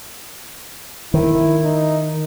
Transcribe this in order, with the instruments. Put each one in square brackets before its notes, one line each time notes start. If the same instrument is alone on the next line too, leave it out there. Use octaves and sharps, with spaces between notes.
[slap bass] D#3 [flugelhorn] E4
[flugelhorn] D#4